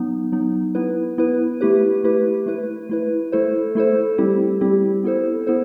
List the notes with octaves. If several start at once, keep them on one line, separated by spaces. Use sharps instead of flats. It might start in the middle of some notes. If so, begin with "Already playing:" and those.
Already playing: F#3 B3 D#4
F#3 B3 D#4
B3 E4 B4
B3 E4 B4
A3 E4 G4 B4
A3 E4 G4 B4
A3 E4 B4
A3 E4 B4
A3 E4 A4 C5
A3 E4 A4 C5
G3 C4 E4 G4
G3 C4 E4 G4
B3 E4 A4 C5
B3 E4 A4 C5